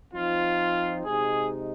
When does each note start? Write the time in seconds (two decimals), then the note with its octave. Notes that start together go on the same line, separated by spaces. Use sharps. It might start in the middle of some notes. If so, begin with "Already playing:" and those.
0.12 F3 C4 D#4 F4
1.06 C3 G#3 D#4 G#4